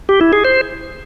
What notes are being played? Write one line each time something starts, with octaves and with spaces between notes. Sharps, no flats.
G4
E4
G#4
C5